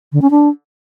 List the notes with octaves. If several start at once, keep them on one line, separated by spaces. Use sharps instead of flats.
D3
C#4
D4